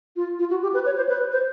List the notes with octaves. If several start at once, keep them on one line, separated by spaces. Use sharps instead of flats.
F4
F4
F#4
G4
B4
C#5
C5
B4
C5